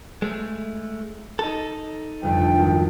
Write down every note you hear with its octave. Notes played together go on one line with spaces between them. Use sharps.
G#3 A3
D#4 A4
G1 F2 G5
G#1